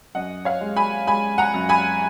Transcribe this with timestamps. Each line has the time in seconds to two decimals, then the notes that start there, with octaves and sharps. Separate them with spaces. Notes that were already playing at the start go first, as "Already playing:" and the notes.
0.15 F#2 D#5 F#5
0.45 C#5 F5
0.61 G#3
0.77 G#5 B5
1.07 G#3 G#5 B5
1.38 F#5 A#5
1.54 F#2
1.69 G#5 B5